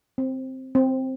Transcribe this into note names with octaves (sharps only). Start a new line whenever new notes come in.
C4
C4